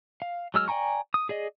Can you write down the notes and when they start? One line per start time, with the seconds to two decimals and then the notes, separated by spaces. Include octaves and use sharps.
0.22 F5
0.54 F#3 G#3 E6 F6
0.68 D5 G5 G#5 A#5 C#6
1.14 D#6
1.29 G#4 D5 D#5